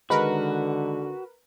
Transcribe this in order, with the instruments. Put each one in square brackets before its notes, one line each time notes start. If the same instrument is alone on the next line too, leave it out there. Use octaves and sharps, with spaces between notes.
[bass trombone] D3 [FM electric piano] D#3 G#3 D#4 [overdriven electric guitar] F#4 [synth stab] A#4 B4